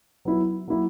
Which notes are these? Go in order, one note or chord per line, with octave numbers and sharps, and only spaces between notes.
F#3 B3 E4
F#3 A#3 E4